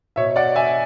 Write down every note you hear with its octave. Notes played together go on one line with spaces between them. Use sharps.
B2 C#5 E5
D5 F#5
E5 G#5